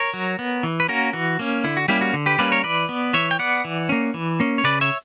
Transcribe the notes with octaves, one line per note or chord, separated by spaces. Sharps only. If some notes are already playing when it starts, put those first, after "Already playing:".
Already playing: A#4 C#5
F#3
B3
E3
B4
A#3 C#4 F#4 A#4
E3 F#4
A#3 C#4
D3 E4
F#4
G3 A#3 C#4 E4 G4
F#4
D3
G4 B4
G3 A#3 C#4 B4 D5
A#4 C#5
E3 B4 D5
B3
E3 C#5 E5
G5
B3 D5 F#5
E3
A#3 C#4
E3
A#3 C#4
C#5
C#3 B4 D5
C#5 E5